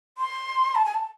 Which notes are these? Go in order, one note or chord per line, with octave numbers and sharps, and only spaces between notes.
C6
A5
G#5
A5